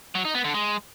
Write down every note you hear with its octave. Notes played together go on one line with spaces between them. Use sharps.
F#3
D#4
B3
D3
G#3